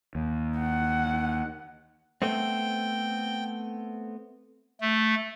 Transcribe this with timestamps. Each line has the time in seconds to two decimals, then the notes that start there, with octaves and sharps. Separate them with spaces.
0.15 D#2
0.59 F#5
2.22 A3 B3 C4 G5
4.80 A3